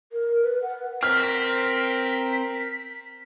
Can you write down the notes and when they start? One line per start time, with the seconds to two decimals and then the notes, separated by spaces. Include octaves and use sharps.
0.13 A#4
0.43 B4
0.63 F#5
1.03 C4 A#4 F6 B6